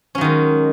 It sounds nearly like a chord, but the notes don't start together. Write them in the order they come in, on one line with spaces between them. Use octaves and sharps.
C#4 F#3 D#3 G#3